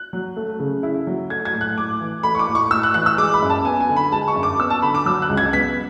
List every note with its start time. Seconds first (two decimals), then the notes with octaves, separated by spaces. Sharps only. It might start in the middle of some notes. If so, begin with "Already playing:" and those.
Already playing: F#6
0.13 F#3
0.37 A3
0.60 C#3
0.83 E4
1.07 F#3
1.30 A3 G#6
1.45 G#6
1.54 A2
1.61 F#6
1.77 A2 D6
2.00 E3
2.23 A3 B5
2.35 C#6
2.39 D6
2.48 A2
2.55 C#6
2.71 A2 E6
2.83 F#6
2.94 E3 F#6
3.06 E6
3.18 G#3 D6
3.34 B5
3.42 F#2
3.50 A5
3.65 B3 G#5
3.80 G#5
3.89 D3
3.96 B5
4.12 G#3 A5
4.28 C#6
4.36 F#2
4.43 D6
4.59 B3 E6
4.70 A5
4.82 D3 B5
4.95 D6
5.06 F#3 E6
5.22 F#6
5.29 C#2
5.37 G#6
5.53 B3 B6